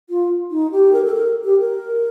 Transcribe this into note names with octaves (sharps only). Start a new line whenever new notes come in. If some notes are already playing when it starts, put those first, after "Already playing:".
F4
D#4
G4
A#4
A4
A#4
G4
A#4